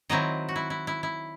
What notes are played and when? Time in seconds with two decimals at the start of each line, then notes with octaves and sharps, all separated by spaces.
0.09 D#3 F#3 C4 E4 D#5
0.49 F#4
0.56 E4
0.70 E4
0.87 E4
1.03 E4